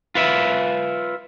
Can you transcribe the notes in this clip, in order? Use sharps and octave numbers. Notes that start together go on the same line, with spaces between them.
F4 B4 E5